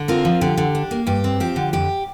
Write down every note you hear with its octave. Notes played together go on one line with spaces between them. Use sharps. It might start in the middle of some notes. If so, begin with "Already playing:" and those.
Already playing: D3
C4 F4 A#4
F3
D3 G4
D3
D4
A#3
G2 G4
C4
F3 G4
D3
F2 G4